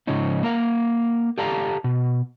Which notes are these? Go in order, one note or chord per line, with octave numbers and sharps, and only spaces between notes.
G#2 C#3 F3 C#4 D#4
A#3 A#4 F5 F#5
G4 A4 D5 F5 A5 A#5
B2